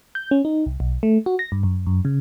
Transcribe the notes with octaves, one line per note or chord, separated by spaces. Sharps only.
G6
C#4
D#4
C2
B1
A3
F#4
A#6
G2
F#2
F#2
C#3